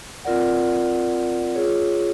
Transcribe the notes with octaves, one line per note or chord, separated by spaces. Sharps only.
C4 F4 A#4 D5 F#5
F4 G#4 C#5